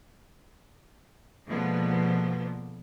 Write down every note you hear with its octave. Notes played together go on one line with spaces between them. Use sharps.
B2 D3 F3 G#3 A#3 B3